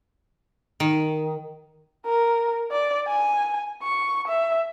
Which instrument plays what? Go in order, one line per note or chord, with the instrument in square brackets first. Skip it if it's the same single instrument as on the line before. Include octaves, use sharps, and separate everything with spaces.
[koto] D#3
[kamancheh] A#4
D5
G#5
C#6
E5